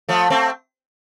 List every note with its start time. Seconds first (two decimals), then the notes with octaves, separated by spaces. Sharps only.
0.09 F3 A3
0.30 A3 C4